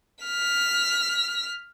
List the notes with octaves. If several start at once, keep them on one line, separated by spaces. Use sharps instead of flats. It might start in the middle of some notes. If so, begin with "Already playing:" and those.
F6 B6